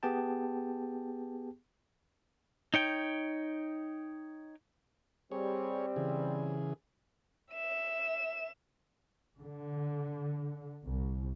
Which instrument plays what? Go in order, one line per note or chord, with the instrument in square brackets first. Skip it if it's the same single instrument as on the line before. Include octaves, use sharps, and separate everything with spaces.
[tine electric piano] B3 G4 G#4 G5 A5
[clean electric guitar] D#4 C#5 G5
[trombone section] G3 C4 [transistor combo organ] G#4 C#5
[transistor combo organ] C#3 E3 G#4
[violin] E5 E7
[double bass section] D3
C2